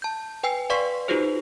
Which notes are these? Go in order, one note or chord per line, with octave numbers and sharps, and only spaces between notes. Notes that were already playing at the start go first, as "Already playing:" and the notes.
A5 G6
B4 G5 G#5 E6 C7
B4 D5 F5 C6 C#6 B6
D#4 F4 F#4 G#4 B4 C5